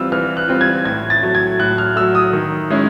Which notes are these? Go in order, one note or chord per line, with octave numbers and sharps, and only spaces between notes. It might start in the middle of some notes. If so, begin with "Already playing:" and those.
Already playing: E3 G3 C4 F4 E6
E3 F6
F#6
G3 C4 F4
G#6
A2 G#6
A6
F#3 A3
G#6
A2 F#6
F6
F#3 A3 E6
D#6
D#3
G#3 C#4 E4